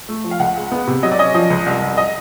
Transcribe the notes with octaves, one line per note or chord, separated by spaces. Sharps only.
A3
F3
F5
C#2 F#5
G#3
B3
C3
F#3 D#5
D5
C#4 D#5
F3 D#5
C#2
C2
C2
D#5